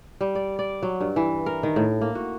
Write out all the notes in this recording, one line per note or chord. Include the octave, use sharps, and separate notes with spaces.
G3
D5
D5
F#3
G2
E3
A#4
D#3
A2
A#3
F#4